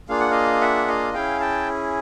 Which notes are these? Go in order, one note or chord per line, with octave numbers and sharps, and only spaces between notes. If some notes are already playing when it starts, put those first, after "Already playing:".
A#3 D4 F4 G#4 F5
F#5
D#5 F5
E5 F#5
D#5 F5
C#4 E4 G#4 F5 G5
G5 A5